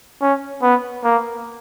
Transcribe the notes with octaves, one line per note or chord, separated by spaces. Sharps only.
C#4
B3
A#3